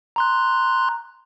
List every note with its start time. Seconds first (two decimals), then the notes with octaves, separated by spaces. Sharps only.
0.16 A#5 C6 F#6